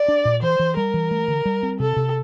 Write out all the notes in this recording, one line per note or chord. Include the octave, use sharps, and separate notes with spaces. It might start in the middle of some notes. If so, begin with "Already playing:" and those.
Already playing: D5
D4
A#2
E3 C5
E3
G3 A#4
E3
A3
D3
G3
C4
C3 A4
C3